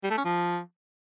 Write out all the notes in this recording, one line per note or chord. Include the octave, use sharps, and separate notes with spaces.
G3
A3
C#4
F3